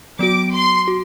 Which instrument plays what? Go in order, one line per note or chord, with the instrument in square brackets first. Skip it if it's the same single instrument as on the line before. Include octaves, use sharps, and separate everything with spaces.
[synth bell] F#3 B3 F#4 [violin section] D6
[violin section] C6
[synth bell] F#4